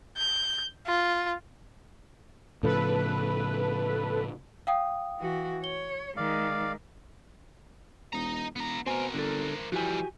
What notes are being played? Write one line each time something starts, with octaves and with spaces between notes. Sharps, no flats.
G6
F4
A2 C#3 F3 A4 B4
F5 G5 D#6
E3 F#4
C#5 G7
D#3 G#3 D5 F5
E1 D#5 A#5
E1 B3 A#5
B2 C4 A#4 C5 G#5
G1 D3 A4
E3 F3 G3 F#4 G4 G#5